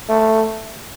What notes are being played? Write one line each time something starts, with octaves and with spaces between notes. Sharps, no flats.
A3